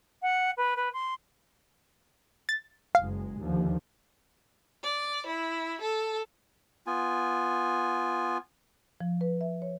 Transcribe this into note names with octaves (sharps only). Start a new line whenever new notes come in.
F#5
B4
B4
C6
A6
F#1 G#3 F5
D#2 D3 F3
D5
E4
A4
B3 F4 G#5
F3
B4
E5
C#5